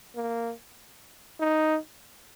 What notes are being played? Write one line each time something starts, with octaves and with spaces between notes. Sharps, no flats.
A#3
D#4